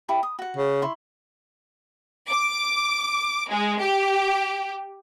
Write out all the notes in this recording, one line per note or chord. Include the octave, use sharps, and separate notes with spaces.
E4 G4 A4
D#6
F#4 F#5
C#3
E4 C6 C#6
D6
G#3
G4